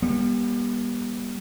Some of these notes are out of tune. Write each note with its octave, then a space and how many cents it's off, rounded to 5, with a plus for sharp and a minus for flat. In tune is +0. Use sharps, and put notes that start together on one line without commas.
G3 +20 B3 -40